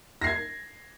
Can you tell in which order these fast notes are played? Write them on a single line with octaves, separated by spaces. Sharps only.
A#6 C7 G#6